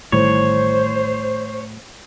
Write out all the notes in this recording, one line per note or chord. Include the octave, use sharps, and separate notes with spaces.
A1 A2 D#3 G3 C5 C#5